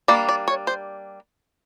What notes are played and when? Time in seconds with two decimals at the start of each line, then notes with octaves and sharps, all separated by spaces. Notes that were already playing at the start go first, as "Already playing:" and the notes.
0.08 G3 A#3 D4 D5
0.29 D5
0.48 C#5
0.67 C5